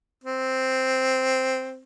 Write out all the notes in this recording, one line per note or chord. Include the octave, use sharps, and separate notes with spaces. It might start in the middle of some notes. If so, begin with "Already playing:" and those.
C4